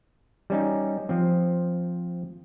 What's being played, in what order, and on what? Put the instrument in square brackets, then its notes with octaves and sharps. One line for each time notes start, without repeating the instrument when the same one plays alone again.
[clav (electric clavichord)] G3 C#4 D#4
F3 C4